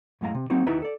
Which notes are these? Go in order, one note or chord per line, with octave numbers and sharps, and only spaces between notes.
F#2 A2 G#3 F5 A#5
C3
F#3 A#3 C4 D#4 F#4
D#2 D#4 E4 B4 A#5
A4 D5